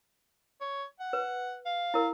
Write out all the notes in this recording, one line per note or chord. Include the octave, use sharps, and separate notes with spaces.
C#5
F#5
B4
F5
E4 A#4